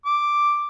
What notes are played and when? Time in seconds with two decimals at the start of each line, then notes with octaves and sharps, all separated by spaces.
0.05 D6